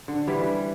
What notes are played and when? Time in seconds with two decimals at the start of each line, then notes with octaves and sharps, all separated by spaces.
0.08 D3
0.27 E3 G3